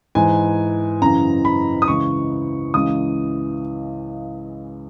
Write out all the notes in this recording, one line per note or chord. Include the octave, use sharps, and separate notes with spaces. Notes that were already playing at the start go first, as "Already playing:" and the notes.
G#2 E3 G#5
F#2 C#3 E3 A#5
B5
D#6
C#2 C#3 E3 C#6
C#2 C#3 E3 D#6